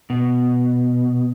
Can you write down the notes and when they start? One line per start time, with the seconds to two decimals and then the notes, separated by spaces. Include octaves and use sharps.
0.10 B2